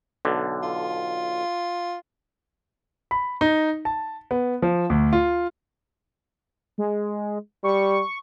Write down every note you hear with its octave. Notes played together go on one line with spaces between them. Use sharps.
B1 D3
F4
B5
D#4
A5
B3
F3
D2
F4
G#3
G3 C#6